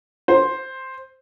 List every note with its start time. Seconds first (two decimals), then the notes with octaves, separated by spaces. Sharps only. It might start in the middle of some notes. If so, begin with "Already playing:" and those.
0.28 C5